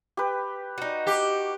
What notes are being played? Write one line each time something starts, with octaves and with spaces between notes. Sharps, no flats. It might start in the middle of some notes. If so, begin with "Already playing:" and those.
G4 B4
D#4 F#4
G4 F#5 D6